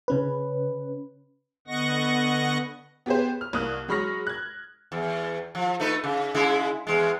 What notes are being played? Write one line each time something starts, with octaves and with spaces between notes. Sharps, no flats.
C#3 C#4 B4
D3 B3 D#5 F#5 C#6 A#6
B3 G4 G#4 B4 C5
F6
C2 A#3 D#6 F#6
F#3 G#3 B5 C#6 F6 A#6
F#6 G#6
E2
F3
A3 D#4 B4
C#3
C#3 G#3 E4
E2 G#3